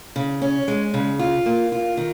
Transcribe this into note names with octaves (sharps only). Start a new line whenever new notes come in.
C#3
C#4
G#3
C#3
F4
A#3
F4
D#3